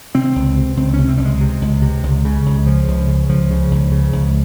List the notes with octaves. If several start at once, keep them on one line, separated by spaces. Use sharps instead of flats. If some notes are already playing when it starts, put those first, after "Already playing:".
C3 C4
C#2
C3
C#2 C4
C3 C#4
C4
C#2 G3
G#3
C3
C#2
C3
C#2
C#3
C#2
C#3 F3
C#2
C#3
C#2 F3
C#3
C#2
C#3
C#2